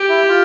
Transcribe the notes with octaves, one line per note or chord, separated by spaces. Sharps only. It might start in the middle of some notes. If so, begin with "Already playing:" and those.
Already playing: G4
E4
F4